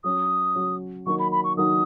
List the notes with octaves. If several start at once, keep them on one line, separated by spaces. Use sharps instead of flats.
F#3 C#4 F#4 D#6
F#3 C#4 F#4
D#3 F#3 A#3 D#4 F#4 C#6
B5
B5
C#6
D#3 F#3 A#3 D#4 F#4 D#6